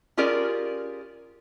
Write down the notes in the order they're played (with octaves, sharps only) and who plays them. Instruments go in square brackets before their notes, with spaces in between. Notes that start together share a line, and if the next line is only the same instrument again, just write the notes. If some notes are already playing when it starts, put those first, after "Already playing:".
[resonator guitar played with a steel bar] C#4 F4 G4 G#4 A#4 D5